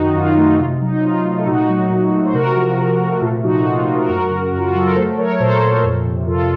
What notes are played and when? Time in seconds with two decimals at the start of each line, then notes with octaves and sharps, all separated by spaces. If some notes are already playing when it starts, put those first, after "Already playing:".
Already playing: F#2 D#3 D#4 F#4
0.15 F#2 F4
0.37 A3
0.59 C3 F4
0.81 F#3 D#4
1.03 C3 F4
1.24 A3
1.39 A4
1.46 A#2 D#4 F#4
1.68 F#3
1.90 A#2
2.12 A3
2.26 C5
2.34 C3 F#4 A#4
2.56 F3
2.77 C3
3.00 A3
3.21 A#2 F4 A4
3.43 F3 D#4 F#4
3.65 A#2 F4
3.86 A3
3.94 F#4 A#4
4.08 F#2 F#4 A#4
4.31 C#3
4.52 F#2
4.58 F4
4.67 F#4
4.74 F#3 A4
4.87 A#4
4.96 A3 A4 C5
5.18 A3 A#4 C#5
5.40 A#2 A4 C5
5.62 A#2
5.84 F2
6.05 C3
6.27 F2 F4 A4